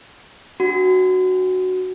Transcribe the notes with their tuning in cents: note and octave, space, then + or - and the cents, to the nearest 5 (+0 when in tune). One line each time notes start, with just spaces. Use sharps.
D4 +0 F#4 +0